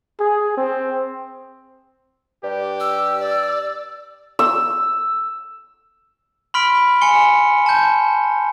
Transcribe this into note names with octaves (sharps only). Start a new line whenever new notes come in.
G#4
C4
G2 G4
E6
D5
E6
B5 C6 F6 B6 D7
G#5 C6 C#7 G7
A5 G6